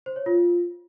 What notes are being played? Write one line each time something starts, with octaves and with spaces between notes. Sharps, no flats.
C5
C#5
F4